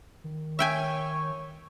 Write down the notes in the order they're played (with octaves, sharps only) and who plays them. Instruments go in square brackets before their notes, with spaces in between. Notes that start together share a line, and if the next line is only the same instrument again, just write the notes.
[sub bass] D#3
[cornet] C#5 [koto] E5 G5 G#5